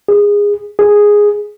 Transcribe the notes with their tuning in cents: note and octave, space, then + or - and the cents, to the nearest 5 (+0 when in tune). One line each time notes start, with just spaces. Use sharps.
G#4 -20
G#4 -5